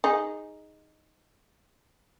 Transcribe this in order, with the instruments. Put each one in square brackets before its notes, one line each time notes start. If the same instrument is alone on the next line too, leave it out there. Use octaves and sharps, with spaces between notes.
[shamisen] D#4 G#4